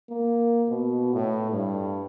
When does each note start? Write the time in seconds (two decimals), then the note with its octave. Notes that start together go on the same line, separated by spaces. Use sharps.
0.10 A#3
0.69 B2
1.14 A2
1.51 G2